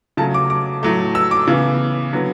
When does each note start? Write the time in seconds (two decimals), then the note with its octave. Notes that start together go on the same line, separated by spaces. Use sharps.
0.17 C#3 F#3 A3 A5
0.34 D6
0.50 D6
0.83 A2 F#3 A3
1.15 E6
1.31 D6
1.47 C#3 E3 B3
2.13 D3 F#3 B3